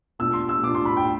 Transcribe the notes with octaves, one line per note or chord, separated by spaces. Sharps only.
B2 A3 D4 F4 E6
C6
E6
B2 A3 D4 F4 D6
C6
B5
G5